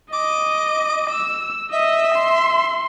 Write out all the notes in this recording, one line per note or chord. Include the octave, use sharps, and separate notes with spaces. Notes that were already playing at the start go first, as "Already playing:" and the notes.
D#5 D6
E6
D#5 E5
C6